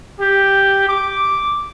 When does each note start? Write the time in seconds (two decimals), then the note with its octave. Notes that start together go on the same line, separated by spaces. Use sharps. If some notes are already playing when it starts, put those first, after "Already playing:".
0.20 G4
0.87 D6